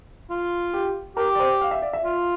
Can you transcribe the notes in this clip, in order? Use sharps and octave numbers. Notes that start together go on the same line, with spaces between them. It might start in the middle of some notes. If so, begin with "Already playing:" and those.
F4
G4
G4 A#4
D5
C5
F5
E5
D5
E5
F4